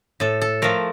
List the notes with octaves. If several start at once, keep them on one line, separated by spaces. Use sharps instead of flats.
A2 A4
A4
F3 A3 A#4